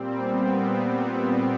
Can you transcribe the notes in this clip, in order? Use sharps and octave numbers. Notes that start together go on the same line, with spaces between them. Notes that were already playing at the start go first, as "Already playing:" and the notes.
Already playing: A#2 G3 C4
B3
C4